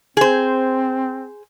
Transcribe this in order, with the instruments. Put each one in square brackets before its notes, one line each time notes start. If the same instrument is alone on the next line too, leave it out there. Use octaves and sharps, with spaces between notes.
[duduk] C4 [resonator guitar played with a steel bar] G#4 C5